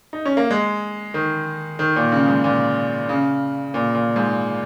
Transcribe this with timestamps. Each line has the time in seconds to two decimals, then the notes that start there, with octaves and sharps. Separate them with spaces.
0.13 D#4
0.25 C#4
0.37 A#3
0.50 G#3
1.14 D#3
1.79 D#3
1.96 A#2
2.12 C#3
2.28 G#2
2.44 A#2
3.09 C#3
3.74 A#2
3.95 A#2
4.16 G#2